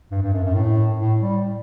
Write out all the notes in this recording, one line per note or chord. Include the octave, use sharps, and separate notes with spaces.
G2
G2
F#2
F#2
A2
A2
G3